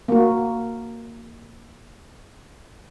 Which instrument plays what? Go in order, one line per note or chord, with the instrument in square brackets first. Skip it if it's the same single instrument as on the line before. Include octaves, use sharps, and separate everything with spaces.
[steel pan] A#3 F#4